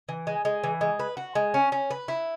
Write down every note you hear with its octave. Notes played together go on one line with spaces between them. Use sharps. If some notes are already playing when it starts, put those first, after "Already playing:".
E3
G#3
G#3
E3
G#3
B4
F#4
G#3
C#4
C#4
B4
E4